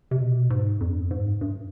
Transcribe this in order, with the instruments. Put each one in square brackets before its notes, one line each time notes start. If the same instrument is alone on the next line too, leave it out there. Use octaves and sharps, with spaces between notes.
[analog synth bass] C3
B2
G#2
F2
G2
F2
G#2
G2